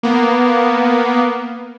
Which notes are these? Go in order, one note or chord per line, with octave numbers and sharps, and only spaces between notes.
A#3 B3